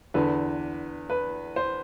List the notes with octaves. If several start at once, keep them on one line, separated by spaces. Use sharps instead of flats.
E2 D3 B4
B4
C5